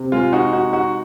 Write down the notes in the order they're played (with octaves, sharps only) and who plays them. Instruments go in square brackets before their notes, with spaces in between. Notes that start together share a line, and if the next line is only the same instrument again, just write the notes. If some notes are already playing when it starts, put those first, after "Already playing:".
Already playing: [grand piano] C3
[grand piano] G#3 [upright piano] F4
[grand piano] D#4 [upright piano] F#4
[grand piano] D#4 [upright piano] F#4
[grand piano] D#4 [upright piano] F#4